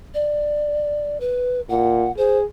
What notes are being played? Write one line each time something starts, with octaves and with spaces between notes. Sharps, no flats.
D5
B4
A#2 F#5
G#4 C5